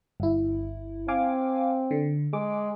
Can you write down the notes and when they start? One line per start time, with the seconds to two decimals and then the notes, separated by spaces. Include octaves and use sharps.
0.20 G1 E4
1.08 C4 F5 G#5 D6
1.91 D3
2.33 G#3 D6